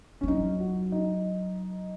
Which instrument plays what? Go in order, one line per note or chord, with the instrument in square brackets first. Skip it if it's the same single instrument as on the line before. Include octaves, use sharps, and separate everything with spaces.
[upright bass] G#3 [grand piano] C#4
[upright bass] F#3 [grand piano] D#4
[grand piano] F#4
D#4